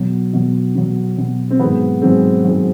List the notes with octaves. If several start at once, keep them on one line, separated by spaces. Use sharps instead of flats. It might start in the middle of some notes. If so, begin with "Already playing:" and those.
Already playing: B2 F#3
B2 F#3
B2 F#3
B2 F#3
C4
G#2 D#3 F#3 B3
G#2 D#3 F#3 C4
G#2 D#3 F#3